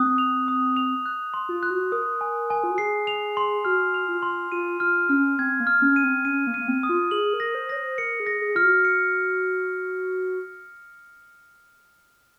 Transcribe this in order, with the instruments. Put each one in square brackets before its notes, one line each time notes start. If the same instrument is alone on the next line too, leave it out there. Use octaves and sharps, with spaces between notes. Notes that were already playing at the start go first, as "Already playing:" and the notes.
Already playing: [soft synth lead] C4 [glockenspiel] D#6 F#6
[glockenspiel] F7
D#6
F7
F#6
C6
[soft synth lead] F4
[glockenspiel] F#6
[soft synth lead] F#4
[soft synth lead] A#4 [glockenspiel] D#6
[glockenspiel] G#5
G#5
[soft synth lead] F4
F#4
[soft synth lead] G#4 [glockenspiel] C7
[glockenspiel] F7
C6
[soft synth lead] F#4 [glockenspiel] F6
[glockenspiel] F7
[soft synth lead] F4
[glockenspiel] C6
[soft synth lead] F4 [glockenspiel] D#7
[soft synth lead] F4 [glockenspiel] F6
[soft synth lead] C#4 [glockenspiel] F6
[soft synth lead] C4 [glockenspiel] G#6
[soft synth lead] A#3
[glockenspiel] F6
[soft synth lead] C#4
[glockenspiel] D#7
[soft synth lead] C4
[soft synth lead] C#4 [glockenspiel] D#7
[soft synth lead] A#3
[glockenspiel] D#7
[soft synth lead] A#3
C4
[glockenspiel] D#6
[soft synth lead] F4
[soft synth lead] G#4 [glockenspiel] F#7
[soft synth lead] A#4
[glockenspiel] A#6
[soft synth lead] C5
[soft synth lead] C#5 [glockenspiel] A#6
[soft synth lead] C5
[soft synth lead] A#4 [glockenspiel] C#7
[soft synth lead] G#4
[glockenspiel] A#6
[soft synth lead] G#4
[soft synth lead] F4 [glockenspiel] F6
[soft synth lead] F#4
[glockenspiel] C#7